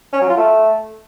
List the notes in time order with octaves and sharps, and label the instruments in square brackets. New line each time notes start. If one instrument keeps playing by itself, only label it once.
[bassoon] C#4
F#3
F4
A3